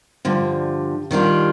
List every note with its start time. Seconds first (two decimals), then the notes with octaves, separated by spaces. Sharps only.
0.25 G2 D3 F3
1.11 D#3 G3 D4 F4